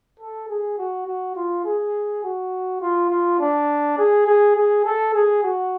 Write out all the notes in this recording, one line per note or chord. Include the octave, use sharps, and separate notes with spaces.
A4
G#4
F#4
F#4
F4
G#4
F#4
F4
F4
D4
G#4
G#4
G#4
A4
G#4
F#4